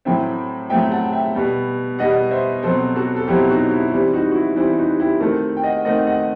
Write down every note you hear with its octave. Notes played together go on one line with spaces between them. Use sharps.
A2 F#3 A3 C4 E5 G5
A2 F#3 A3 C4 E5 G5
F#5 A5
E5 G5
B2 G3 B3
B2 G3 B3 D#5 F#5
C5 E5
B2 F#3 C4 A4 C5
F#4 A4
A4
B2 F#3 C4 E4 G4
D#4 F#4
E4
E3 G3 C4 E4
D#4 F#4
F#4
E4
E3 G3 C4 E4
D#4 F#4
E4 G4
D#3 A3 C4 F#4 A4
G5
D#5 F#5
D#3 A3 C4 D#5 F#5
D#5 F#5